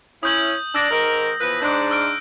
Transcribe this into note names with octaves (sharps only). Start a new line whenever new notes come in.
C#4 E4 D#6 G6 F#7
D4 E6 A#6
G#2 D#3 A#4
E2 F3 B4
G#2 D4 F#6 G6
E6 F6 D7